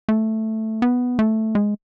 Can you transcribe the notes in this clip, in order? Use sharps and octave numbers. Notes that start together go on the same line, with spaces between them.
A3
B3
A3
G#3